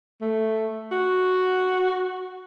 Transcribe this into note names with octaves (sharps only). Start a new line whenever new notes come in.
A3
F#4